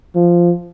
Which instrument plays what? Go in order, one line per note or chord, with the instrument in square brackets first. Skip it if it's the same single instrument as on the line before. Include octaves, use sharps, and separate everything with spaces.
[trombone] F3